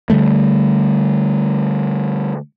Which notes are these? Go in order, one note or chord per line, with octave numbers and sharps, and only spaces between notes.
D3 G3 A3